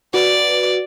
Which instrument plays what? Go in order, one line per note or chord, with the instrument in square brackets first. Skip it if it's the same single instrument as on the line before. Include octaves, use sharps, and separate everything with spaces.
[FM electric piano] F#4 B4 [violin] D5